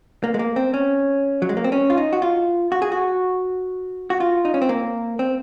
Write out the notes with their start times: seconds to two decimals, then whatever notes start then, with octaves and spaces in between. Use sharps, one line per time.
0.24 A#3
0.34 G#3
0.39 A#3
0.56 C4
0.74 C#4
1.42 F#3
1.49 G#3
1.57 A#3
1.64 C4
1.72 C#4
1.90 F4
1.97 D#4
2.13 F#4
2.22 F4
2.72 F#4
2.82 G#4
2.92 F#4
4.10 F#4
4.20 F4
4.45 D#4
4.54 C#4
4.62 C4
4.69 A#3
5.19 C4